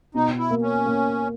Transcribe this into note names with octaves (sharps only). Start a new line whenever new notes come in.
B2 D#4
E4
A#3
C#4
A#3